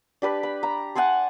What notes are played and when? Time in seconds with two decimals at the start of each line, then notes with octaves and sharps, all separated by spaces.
0.22 D4 G4 B4
0.43 B5
0.63 A#5
0.95 F#5 G#5 A5 C6